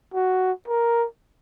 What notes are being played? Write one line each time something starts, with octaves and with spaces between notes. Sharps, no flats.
F#4
A#4